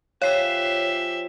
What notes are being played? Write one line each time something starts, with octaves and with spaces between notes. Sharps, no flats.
F3 F4 G4 C#5 E5 F5 G#5 C7